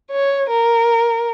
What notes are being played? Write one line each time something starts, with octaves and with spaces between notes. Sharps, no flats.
C#5
A#4